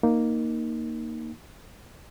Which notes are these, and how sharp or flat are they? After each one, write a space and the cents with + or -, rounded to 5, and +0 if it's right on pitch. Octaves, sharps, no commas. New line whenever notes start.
A#3 +0 D#4 +0